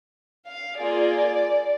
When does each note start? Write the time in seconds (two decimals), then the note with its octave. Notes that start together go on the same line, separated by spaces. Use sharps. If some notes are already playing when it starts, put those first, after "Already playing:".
0.45 F5
0.77 A#3 F4 G#4 D5